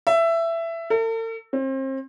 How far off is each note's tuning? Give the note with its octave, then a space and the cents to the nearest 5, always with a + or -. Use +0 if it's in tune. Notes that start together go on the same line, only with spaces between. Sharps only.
E5 +15
A4 +45
C4 +35